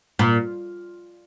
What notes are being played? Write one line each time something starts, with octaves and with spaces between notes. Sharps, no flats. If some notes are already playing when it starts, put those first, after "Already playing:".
A#2